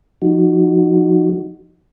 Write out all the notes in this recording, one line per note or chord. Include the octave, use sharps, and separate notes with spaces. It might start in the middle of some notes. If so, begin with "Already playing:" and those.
F3 D#4 F#4